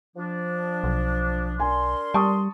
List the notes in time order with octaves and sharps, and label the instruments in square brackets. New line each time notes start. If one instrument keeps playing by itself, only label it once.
[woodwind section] F3 D4
[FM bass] B1
[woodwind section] D4 A#4 C6 [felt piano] G#5
[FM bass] G3 [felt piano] A5 C#6 D#6